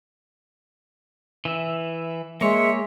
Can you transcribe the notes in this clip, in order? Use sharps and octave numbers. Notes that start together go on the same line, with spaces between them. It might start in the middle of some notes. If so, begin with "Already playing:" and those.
E3 E5
G#3 A#3 C#5 E5 C6 E6